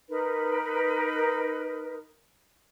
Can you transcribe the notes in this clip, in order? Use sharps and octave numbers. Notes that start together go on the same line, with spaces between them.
D#4 A#4 B4